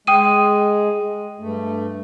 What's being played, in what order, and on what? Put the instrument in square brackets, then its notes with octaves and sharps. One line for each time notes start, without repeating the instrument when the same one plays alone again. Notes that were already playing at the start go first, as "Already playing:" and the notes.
[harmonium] G#3 [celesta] G5 D#6 D#7
[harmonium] G2 A3